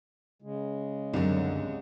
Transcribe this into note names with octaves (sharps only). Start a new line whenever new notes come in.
C#3 G#3
C2 F#2 D3